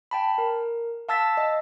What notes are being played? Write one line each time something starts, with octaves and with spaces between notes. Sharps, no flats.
G5 A5 B5
A#4
F5 A5 E6 A6 B6
D#5